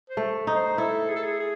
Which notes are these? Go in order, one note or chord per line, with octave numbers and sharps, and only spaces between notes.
C5
A3
D#4
C5
E4 A4
G#4
A4
G#4
G#4